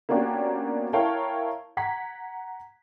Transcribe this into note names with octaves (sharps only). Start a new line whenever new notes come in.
A#3 B3 C#4 D4 F#4 G4
E4 A#4 C#5 F5 G5 A5
F#5 A#5 G#6 B6